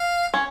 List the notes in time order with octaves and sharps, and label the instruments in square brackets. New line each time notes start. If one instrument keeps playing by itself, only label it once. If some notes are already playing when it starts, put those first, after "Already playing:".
Already playing: [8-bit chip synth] F5
[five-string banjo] C#4